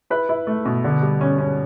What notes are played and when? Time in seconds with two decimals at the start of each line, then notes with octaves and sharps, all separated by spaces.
0.10 E4 B4
0.29 E4
0.47 A3
0.65 B2
0.84 D3
1.02 G3
1.21 C#4
1.38 C#4